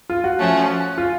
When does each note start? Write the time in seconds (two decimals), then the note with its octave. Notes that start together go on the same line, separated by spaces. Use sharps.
0.10 F4
0.24 F#4
0.39 F3 A3 C#4
0.98 F4